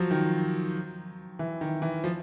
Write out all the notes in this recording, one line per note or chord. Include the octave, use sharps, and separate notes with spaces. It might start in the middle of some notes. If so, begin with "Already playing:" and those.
Already playing: F3 F#3
D#3
E3
D#3
E3
F3